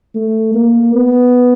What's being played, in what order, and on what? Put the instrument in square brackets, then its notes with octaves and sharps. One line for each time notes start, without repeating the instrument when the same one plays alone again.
[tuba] A3
A#3
B3